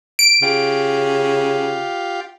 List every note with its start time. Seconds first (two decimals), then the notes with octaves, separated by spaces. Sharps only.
0.19 D7
0.42 C#3 F4 G4